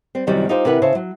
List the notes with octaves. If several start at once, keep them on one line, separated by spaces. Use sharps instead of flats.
G3 C4
F#2 C3 D#3 F#3 G3
D#4 F4 G4 C5
C3 E3 A#4 B4 F#5
C#3 C5 E5 A5
F#3